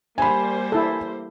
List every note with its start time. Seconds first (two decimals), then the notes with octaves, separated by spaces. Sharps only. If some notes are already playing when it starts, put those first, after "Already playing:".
0.18 G3 A#3 C5 G#5 B5
0.72 E4 A4